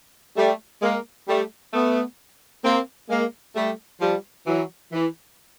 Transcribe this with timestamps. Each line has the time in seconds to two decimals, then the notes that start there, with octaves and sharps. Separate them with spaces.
0.37 G3 A3
0.82 G#3 A#3
1.28 G3 A3
1.74 A3 B3
2.64 A#3 C4
3.10 G#3 A#3
3.55 G3 A3
4.01 F3 G3
4.47 E3 F#3
4.92 E3